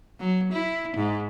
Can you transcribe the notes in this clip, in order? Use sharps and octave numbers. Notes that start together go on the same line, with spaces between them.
F#3
E4
G#2